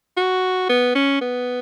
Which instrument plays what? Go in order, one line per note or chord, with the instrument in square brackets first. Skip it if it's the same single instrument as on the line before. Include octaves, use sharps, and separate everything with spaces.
[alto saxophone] F#4
B3
C#4
B3